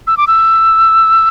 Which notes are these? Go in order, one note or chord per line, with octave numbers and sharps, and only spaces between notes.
E6
D6
E6